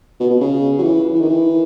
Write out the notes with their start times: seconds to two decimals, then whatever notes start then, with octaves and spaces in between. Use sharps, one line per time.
0.20 B2
0.30 B2
0.40 C#3
0.79 F#3
0.82 E3
1.14 E3
1.21 D#3
1.29 E3